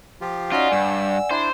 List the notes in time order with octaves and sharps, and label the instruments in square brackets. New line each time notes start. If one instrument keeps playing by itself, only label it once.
[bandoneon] F3 F4 G4
[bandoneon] C#4 D#4 F#4 [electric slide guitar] F4 [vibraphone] D5 F#5 G#5
[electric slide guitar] G2 [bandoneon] E6
[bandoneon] D4 E4 [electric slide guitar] C5